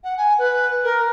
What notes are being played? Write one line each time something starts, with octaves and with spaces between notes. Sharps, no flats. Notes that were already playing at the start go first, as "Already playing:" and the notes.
F#5
G#5
B4
A#4